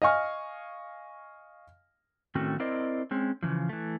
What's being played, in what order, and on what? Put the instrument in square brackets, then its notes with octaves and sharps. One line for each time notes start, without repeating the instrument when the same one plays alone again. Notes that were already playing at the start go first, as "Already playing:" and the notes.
[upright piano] D#5 F5 G#5 C#6 F6
[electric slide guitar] A2 D#3 A3 C4 C#4 F#4
C4 E4 A#4 C5 D5 D#5
G#3 C4 C#4
C#3 E3 F3
E3 A3